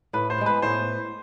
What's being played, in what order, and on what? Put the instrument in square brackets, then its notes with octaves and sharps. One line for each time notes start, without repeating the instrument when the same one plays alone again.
[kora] A2 [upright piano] B4
[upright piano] C5
[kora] G#3 B3
[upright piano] B4
[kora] A2 [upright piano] C5